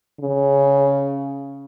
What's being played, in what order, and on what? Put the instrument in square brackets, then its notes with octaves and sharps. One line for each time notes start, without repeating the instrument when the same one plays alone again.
[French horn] C#3